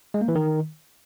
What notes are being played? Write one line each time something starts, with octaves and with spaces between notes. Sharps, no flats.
G#3
A#3
E3
D#3